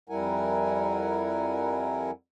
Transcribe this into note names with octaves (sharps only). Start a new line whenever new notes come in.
F2 G3 E4 A#4 F#5 G#5